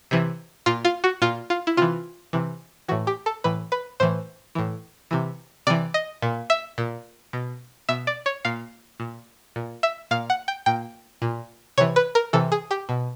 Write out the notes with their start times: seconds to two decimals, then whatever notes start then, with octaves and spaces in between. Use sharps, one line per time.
0.11 C3 E3
0.66 A#2 F4
0.85 F4
1.04 F#4
1.22 A#2 F4
1.50 F4
1.67 E4
1.77 C3 E3 F4
2.33 C3 E3
2.89 E3 F#4
2.92 A2
3.07 G4
3.26 A4
3.44 A2 E3 B4
3.72 B4
4.00 A2 E3 C5
4.55 A2 E3
5.11 C3 E3
5.67 C3 E3 D5
5.94 D#5
6.22 A#2
6.50 E5
6.78 A#2
7.33 B2
7.89 B2 E5
8.07 D5
8.26 C#5
8.45 A#2 F5
9.00 A#2
9.56 A#2
9.83 E5
10.11 A#2 F5
10.30 F#5
10.48 G5
10.66 A#2 G5
11.22 A#2
11.78 C3 E3 C#5
11.96 B4
12.15 A#4
12.33 C3 E3 A4
12.52 G#4
12.71 G4
12.89 B2